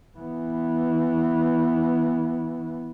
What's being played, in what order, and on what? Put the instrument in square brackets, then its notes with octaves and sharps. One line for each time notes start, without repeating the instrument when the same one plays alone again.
[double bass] E3 B3